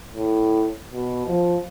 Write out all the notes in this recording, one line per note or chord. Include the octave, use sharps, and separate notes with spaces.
A2
B2
F3